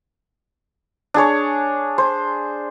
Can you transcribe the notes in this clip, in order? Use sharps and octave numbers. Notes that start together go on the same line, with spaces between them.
D4 G#4 C#5
C5